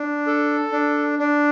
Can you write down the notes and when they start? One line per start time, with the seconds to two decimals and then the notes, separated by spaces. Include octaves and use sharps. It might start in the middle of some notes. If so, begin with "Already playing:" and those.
Already playing: D4
0.27 A4
0.72 D4
1.19 D4